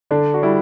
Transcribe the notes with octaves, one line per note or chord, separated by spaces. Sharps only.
D3 D4
F#4
G3 E4